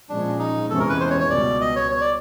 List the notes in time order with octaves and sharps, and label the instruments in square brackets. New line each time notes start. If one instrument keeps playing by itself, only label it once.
[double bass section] A#2 F3 G#3 C#4 [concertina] D4
[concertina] D#4
[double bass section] E2 C3 E3 G#3 C#4 [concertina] A4
[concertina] A#4
B4
C5
C#5
C#5
[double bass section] C#2 B2 G3 B3 [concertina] D5
[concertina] D#5
C#5
C#5
D5